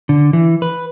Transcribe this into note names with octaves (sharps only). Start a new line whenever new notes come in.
D3
E3
B4